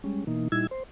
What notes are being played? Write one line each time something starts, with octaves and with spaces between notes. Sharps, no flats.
G3 G#3 C#4
B2 E3 A#3 D#4
A#2 G3 D#4 E4 E6 G#6
C5